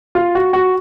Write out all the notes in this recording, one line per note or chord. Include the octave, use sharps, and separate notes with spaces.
F4
F#4
F#4